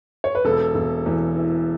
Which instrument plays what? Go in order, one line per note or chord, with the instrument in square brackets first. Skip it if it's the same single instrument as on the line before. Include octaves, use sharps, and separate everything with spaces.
[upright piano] C#5
B4
E1 A4
E1
E2
E3